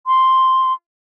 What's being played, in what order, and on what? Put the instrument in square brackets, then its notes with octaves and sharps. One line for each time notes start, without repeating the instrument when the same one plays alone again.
[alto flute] C6